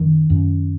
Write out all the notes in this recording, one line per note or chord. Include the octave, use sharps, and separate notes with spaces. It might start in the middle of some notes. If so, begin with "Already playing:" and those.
Already playing: F#2 D#3
F#2